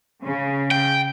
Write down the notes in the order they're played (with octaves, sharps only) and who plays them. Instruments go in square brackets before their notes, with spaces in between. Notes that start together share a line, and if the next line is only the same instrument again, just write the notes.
[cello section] C#3
[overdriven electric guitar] G5